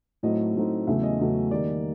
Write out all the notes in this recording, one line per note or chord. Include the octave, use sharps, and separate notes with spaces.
A2 F#3 A3 C4 D#4 D#5
A2 F#3 A3 C4 D#4
E2 C#3 F#3 A3 E5
D#5
E2 C#3 F#3 A3
D#3 G3 A#3 D5